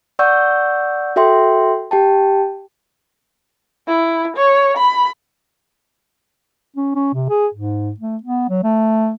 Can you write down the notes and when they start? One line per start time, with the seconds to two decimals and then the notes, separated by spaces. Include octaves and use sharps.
0.19 D5 F#5 C#6 E6 G6
1.16 F#4 A4 E5 G5 C6
1.91 G4 G5 A5
3.88 E4
4.37 C#5
4.77 B5
6.76 C#4
6.95 C#4
7.13 C3
7.29 G#4
7.54 G#2
8.00 A3
8.23 B3
8.49 F#3
8.63 A3